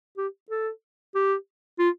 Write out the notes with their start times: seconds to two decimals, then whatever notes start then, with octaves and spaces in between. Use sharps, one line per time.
0.17 G4
0.50 A4
1.15 G4
1.79 F4